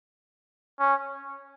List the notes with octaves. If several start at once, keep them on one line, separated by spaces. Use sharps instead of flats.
C#4